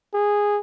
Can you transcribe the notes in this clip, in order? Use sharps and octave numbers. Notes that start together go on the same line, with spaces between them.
G#4